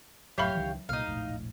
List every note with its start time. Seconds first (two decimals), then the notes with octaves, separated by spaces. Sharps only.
0.38 F1 A2 F#3 G4 C#5 E5 F5 B5
0.55 C#2 D#3 E3
0.89 C2 A#2 D#4 F5
1.05 E1 A#1 A2